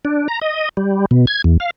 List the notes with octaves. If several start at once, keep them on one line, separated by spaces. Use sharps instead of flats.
D4
A#5
D#5
G3
B2
G#6
E2
F5